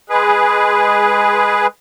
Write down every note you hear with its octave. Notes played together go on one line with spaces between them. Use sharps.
G#3 G#4 B4